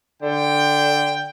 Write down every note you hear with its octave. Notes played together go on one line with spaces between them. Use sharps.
D3 G5